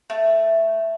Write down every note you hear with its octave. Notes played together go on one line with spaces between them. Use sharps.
A3